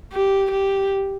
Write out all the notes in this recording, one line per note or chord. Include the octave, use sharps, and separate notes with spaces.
G4
G4